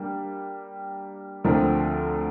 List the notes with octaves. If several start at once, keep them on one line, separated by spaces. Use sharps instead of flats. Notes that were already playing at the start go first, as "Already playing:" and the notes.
Already playing: G3 A#3 D4
D2 D3 F3 C4 A#4